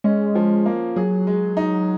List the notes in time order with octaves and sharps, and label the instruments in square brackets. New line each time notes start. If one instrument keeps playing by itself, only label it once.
[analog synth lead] G#3 [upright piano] C#4
[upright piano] F3
A#3
[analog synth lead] F#3 [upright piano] G#4
[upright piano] G#3
D#4